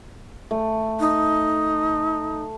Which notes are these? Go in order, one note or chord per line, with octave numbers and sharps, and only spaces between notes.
A3
D#4